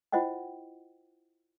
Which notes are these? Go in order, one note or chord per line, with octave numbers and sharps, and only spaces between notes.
E4 F4 C5 D#5 F#5 G5